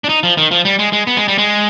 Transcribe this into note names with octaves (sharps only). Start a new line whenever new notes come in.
D4
D#4
F3
D#3
F3
G3
G#3
G#3
B3
G#3
G3
G#3